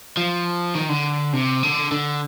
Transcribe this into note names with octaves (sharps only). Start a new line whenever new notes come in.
F3
D#3
D3
C3
D3
D3